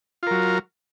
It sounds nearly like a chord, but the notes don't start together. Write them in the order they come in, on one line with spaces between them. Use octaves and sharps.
F4 A#4 F#3